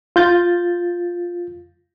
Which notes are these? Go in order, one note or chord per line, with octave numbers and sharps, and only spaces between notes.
F4 G6 A6